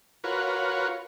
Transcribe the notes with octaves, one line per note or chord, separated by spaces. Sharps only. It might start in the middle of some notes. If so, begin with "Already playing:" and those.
F4 F#4 A#4 B4 C#5